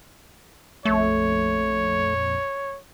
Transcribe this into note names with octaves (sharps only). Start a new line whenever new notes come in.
A#1 F2 A3 C#5